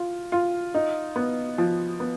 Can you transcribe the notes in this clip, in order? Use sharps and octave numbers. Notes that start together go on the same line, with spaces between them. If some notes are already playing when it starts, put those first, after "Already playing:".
Already playing: F4
F4
D#4
B3
F3
B3